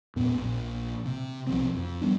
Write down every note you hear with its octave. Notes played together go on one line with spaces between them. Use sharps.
E2 A#2 B3
A#1 A#2
C3
B1 F3 C4
F2
E1 G3 B3 D4